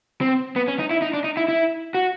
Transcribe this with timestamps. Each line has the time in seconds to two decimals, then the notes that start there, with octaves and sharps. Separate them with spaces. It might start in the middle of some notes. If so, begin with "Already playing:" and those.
0.21 C4
0.56 B3
0.68 C#4
0.79 D#4
0.91 E4
1.02 D#4
1.14 D4
1.24 D#4
1.37 E4
1.48 E4
1.95 F#4